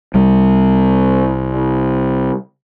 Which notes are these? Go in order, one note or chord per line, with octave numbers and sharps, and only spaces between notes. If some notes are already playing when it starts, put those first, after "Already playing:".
C2 G3